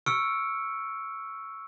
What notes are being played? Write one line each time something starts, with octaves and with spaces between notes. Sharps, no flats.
C#6 E6 F6 C#7 D7